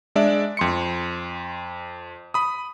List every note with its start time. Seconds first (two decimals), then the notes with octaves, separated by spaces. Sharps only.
0.16 G#3 D4 D5 E5
0.57 F2 C6 C#7
2.34 B5 D#6